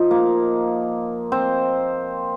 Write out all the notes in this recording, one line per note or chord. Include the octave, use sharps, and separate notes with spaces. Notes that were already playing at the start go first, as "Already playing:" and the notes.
Already playing: F3 D#4 F4
A#3 A#4
C4 C5